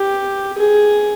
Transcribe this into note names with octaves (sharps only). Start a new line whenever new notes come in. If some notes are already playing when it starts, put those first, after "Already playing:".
Already playing: G4
G#4